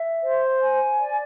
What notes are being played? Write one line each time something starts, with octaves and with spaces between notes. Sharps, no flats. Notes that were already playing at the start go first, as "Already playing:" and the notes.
Already playing: E5
C5
G#5
D5